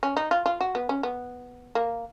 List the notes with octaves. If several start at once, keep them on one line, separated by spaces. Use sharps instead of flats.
C#4
D#4
F4
F4
F#4
B3
C#4
B3
A#3